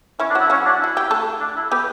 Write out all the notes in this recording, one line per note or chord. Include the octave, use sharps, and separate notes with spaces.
E3 C#4 E4
D4
F#3 F#4
E4
F#3 C#4 F#4
D4
E4 F#4
G4
A3 A4
D4
E4
B3 G4 B4